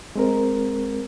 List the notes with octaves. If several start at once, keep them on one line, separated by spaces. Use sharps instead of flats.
G#3 C4 A#4